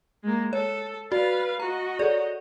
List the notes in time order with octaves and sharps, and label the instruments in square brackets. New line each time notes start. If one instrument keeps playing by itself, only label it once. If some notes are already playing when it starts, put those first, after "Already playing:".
[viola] G#3 A#3
[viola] A4 [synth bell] C#5
[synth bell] F#4 [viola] B4 F5 [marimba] D5
[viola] F#4 D#5 [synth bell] A#5
[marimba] G#4 A4 C#5 [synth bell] D5